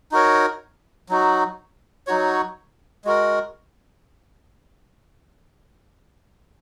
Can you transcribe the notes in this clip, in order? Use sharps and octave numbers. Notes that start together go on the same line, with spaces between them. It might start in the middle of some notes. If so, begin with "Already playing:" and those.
D#4 F#4 A#4 C#5
F#3 D#4 F#4
F#3 D#4 F#4 C#5
G#3 F#4 A#4